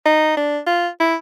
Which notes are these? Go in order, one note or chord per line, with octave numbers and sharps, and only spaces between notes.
D#4
D4
F4
E4